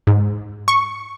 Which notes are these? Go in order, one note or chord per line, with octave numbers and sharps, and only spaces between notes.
G#2
C#6